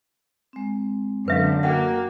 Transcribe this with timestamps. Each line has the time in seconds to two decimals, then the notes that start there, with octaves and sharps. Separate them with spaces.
0.53 G#3 C4
1.28 F#2 D3 B4 E5 F5
1.63 A#3 F#4 E5 F#5 G5